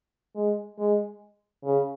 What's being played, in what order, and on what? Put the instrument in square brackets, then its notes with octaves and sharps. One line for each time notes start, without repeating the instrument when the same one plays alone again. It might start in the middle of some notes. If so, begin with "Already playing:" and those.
[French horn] G#3
G#3
C#3